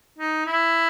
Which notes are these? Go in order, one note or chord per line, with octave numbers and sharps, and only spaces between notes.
D#4
E4